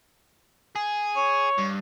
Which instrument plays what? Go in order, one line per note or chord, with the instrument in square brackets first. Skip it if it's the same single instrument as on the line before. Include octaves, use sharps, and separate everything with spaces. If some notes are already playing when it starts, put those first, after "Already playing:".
[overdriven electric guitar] G#4
[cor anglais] C#5
[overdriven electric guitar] G2